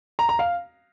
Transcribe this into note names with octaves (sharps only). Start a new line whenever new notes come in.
A#5
A#5
F5